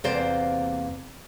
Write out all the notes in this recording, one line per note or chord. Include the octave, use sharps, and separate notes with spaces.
E2 C3 A#3 C5 D5 F5